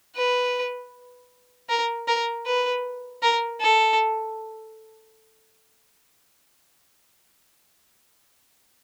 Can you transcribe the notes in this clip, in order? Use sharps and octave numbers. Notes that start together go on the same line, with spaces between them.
B4
A#4
A#4
B4
A#4
A4